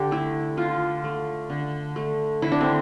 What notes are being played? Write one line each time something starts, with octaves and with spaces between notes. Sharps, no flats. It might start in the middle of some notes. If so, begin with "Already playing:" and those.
Already playing: D3 G4
A3 E4
D3 F4
A3
D3
A3
D3 E4
D4
C4